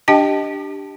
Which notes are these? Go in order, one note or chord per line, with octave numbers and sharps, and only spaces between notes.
D4 G4 D#5 G5 A5